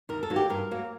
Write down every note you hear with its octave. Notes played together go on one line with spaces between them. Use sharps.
D#2 A#4
A4
D#3 F#3 A#3
G4
G2 A#4
F#3 A#3